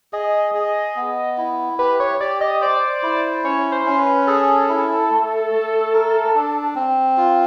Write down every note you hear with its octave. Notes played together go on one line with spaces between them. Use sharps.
G#4 D#5
G#4
B3
E4
G4 B4
C#5
G4 D5
D#5
C5 D5
E4
C#4 C#5
C5
C#4
C5
B4
G#4 A4
E4
A3
A3
A#4
D4
C4
F4